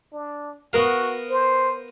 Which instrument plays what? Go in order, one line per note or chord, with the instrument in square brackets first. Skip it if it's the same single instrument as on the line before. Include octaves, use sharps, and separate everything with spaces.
[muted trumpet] D4
[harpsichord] B3 A#4 F5 [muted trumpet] F#4
[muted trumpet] C5